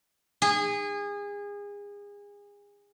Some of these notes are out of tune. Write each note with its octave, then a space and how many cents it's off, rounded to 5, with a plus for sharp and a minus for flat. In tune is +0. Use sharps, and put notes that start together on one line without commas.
G#4 -30